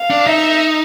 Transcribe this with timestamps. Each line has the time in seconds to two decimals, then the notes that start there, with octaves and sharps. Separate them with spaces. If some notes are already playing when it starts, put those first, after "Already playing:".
Already playing: F5
0.10 D4
0.27 D#4 E5